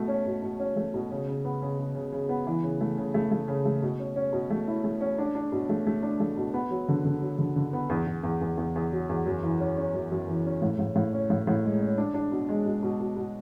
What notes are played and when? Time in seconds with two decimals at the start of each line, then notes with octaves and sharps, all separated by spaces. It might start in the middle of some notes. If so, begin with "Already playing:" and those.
Already playing: B2 A3
0.08 C#4
0.26 B2
0.42 B2
0.60 C#4
0.76 A3
0.94 B2
1.11 C#3
1.27 C#3
1.45 B3
1.62 C#3
1.78 C#3
1.95 C#3
2.12 C#3
2.29 B3
2.47 E3
2.63 C#3
2.81 A3
2.97 C#3
3.14 A3
3.31 A3
3.48 C#3
3.65 A3
3.82 B2
3.99 C#4
4.16 C#4
4.33 B2
4.50 A3
4.67 E4
4.84 A3
5.01 C#4
5.18 D4
5.35 D4
5.52 B2
5.69 A3
5.87 A3
6.03 D4
6.20 A3
6.37 B2
6.54 B3
6.71 F#3
6.89 D3
7.05 D3
7.22 F#3
7.38 D3
7.56 D3
7.73 B3
7.90 E2
8.07 E2
8.23 E2
8.41 E2
8.57 E2
8.76 E2
8.92 F#3
9.09 E2
9.26 F#2
9.43 E3
9.60 C#4
9.77 C#4
9.94 F#2
10.11 F#2
10.28 E3
10.45 C#4
10.62 A2
10.79 A2
10.96 A2
11.13 C#4
11.30 A2
11.47 A2
11.64 G#3
11.81 C#4
11.98 D4
12.14 D4
12.32 B2
12.49 G#3
12.66 B2
12.83 B2
13.00 B2
13.17 B2